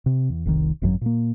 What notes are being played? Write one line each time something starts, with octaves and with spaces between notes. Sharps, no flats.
C3
E2
F1 C2 C3 D#3
G#1 F#2 C#3 F#3
A#2 A#3